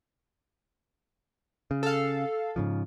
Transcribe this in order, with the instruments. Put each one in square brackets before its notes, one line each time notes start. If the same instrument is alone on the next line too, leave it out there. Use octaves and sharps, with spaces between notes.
[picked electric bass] C#3
[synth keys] A4 F5
[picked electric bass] G#2 C#3 F3